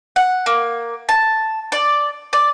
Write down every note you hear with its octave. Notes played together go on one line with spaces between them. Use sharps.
F#5
A#3
A5
D5
D5